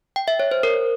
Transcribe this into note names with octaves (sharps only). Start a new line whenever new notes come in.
G5
E5
C#5
C5
A#4